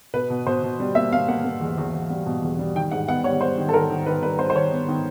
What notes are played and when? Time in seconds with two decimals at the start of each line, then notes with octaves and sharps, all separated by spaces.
0.14 B2 B4
0.30 B2
0.47 B2 C5
0.63 B2
0.80 G3
0.95 A#3 E5
1.13 A#3 F5
1.28 A#3 F#5
1.45 A#3
1.61 E2
1.78 E2
1.94 E2
2.10 G3
2.26 B2
2.43 E2
2.59 G3
2.75 D#3 G5
2.91 G#2 F#5
3.08 B3 F#5
3.24 G3 C#5
3.41 G3 C5
3.57 D#3
3.69 A4
3.73 D#3 A#4
3.90 D#3
4.06 D#3 B4
4.22 G3 B4
4.39 G3 C5
4.50 C5
4.55 D#3 C#5
4.72 B3
4.88 D#3